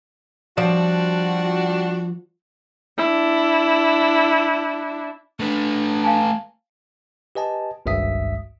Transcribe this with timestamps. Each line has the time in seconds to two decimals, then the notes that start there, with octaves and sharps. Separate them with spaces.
0.58 F3 G3 D4 F#4 D5
2.98 D4 E4
5.40 A3 D4 B4
6.04 F5 G#5 A5
7.35 G4 B4 D#5 G#5 A5
7.86 G#1 C#2 G2 E5 D#6 B6